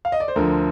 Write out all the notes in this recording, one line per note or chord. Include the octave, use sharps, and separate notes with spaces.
F5
D#5
D5
C5
D2 D3 F3 A#4